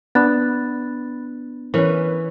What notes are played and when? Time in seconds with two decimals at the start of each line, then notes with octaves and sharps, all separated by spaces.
0.15 B3 D4 B5 F#6 A6
1.74 E3 C#4 A#4 B4 C#5